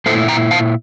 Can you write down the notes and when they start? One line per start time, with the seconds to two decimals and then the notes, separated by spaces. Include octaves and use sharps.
0.06 A#2 A3 E4 A4 C5
0.28 G5 A#5
0.51 F5 A5